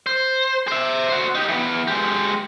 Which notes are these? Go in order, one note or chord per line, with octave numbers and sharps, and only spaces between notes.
C5
C5 E5
F#4 C5
D#4 G4
E3 B3
G#3 G4